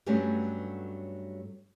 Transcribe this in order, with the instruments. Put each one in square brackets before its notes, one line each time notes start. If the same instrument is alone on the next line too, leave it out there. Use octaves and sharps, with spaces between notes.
[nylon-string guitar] G2 F#3 G3 A3 B3 C#4